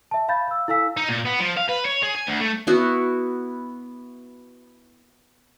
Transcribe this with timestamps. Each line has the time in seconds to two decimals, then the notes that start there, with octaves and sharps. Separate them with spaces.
0.11 E5 A5
0.29 F5 B5 G6 A6
0.48 F5 E6
0.68 E4 A4 F5 G#5 E6 B6
0.97 D#4
1.09 A#2
1.25 B3
1.40 F3
1.57 F5
1.69 B4
1.86 C#5
2.03 G#4
2.15 G#5
2.27 D2
2.41 A3
2.67 B3 E4 F#4